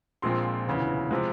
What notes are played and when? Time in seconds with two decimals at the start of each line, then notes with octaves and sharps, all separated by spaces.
0.22 A#1 A#2 F3 G#3 C4 C6
0.66 E1 D2 C#3 E3
1.11 C3 F3 G#3